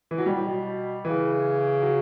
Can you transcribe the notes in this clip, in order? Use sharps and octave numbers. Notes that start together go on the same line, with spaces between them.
E3
F#3
B2 G3
A2
B2
C#3 E3
F#3